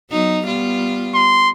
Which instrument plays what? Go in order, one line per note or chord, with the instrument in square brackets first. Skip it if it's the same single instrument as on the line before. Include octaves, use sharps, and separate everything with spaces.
[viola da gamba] F#3 B3 D#4
G3 B3 F4
[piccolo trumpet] C6